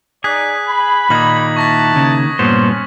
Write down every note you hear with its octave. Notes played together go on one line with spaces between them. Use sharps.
D#4 G#4 D5 F#6 B6
B5
A#2 D#3 A#3 D#4 D#6 G#6 F#7
E4 F#4 A5 C#6 A#6 B6
C#3
G2 A#2 B3 C#4 C5